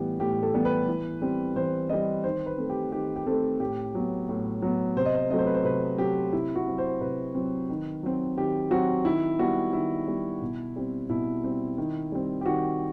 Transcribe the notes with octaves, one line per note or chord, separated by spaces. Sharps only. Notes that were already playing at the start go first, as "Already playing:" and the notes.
Already playing: A2 E3 G3 B3 G4
A2 G4
A4
E3 G3 B3
B4
E3
G3 C4
E3 C5
G3 C4 D#5
D#3 C5
B4
A3 C4
G4
D#3 G4
G4
A3 C4 A4
A2 G4
F#3 B3
A2
F#3 B3
C3 C5
D#5
C5
F#3 A3 C4 D#5
C5
B4
C5
C3 B4
F#3 A3 C4 G4
C3 E4
F#4
F#3 C4
C5
C3 B4
F#3 C4
D#3
F#3 C4
D#3 G4
F#3 C4 F#4
D#3 E4
G3 B3 F#4
D#3 E4
G3 B3
B2
G3 C4
B2 E4
G3 C4
D#3
G3 C4
G4
D#3 F#4